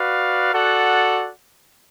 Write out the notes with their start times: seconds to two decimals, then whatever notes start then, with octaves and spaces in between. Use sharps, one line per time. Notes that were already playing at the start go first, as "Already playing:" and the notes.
Already playing: F#4 B4 D5 F5
0.51 F#4 A4 D5 F#5